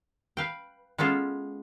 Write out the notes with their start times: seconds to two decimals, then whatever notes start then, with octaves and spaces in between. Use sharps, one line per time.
0.37 B4 F5 G5
0.98 G#3 B3 C#4 F4 A4